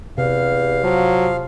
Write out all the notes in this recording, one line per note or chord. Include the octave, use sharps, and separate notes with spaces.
E2 C3 F5
F3 F#3